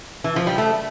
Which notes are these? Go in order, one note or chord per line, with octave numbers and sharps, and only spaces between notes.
E3
F3
G3
A3